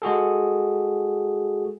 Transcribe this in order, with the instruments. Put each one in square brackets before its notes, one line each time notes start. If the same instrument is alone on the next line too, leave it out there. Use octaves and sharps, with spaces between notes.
[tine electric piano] G#3 F#4 G#4 A4